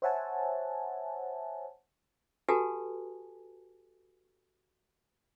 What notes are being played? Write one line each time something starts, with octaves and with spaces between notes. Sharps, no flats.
C5 C#5 E5 F#5 G#5 A5
F#4 G4 A4 B4 G#5 A5